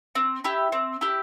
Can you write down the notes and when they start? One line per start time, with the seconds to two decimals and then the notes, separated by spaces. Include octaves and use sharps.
0.15 C4
0.44 E4 G4
0.72 C4
1.01 E4 G4